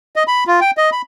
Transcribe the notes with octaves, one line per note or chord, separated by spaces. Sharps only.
D#5
B5
F4
G5
D#5
B5